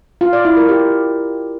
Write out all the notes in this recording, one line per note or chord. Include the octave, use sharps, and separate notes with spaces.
F4
D5
E4
A#4
G4